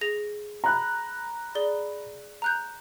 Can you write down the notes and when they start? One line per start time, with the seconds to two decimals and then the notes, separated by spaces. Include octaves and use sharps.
0.01 G#4 A#6 F7
0.64 A#5 B5 F#6
1.55 G#4 D5 G7
2.42 A#5 F#6 G6